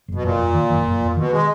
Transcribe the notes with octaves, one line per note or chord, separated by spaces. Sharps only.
F#1
B2
F#1 A#2
F2
D#3
F#1
F#1
F2
B2 D#3
G#3